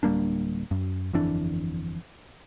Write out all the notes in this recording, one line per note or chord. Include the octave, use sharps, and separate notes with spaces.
D1 G3 A#3 D4
F#2
G1 F2 E3 D4